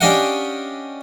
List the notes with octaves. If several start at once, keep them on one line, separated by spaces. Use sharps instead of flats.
C#4 D4 G4 D#5 F5 F#5